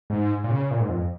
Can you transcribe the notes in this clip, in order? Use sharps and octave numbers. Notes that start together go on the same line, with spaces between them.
G#2
A#2
C#3
A#2
G#2
F2